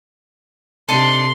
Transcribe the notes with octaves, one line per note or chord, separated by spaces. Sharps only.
C3 D4 D#4 A4 C6